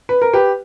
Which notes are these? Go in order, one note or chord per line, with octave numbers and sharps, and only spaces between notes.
B4
A#4
G4 B4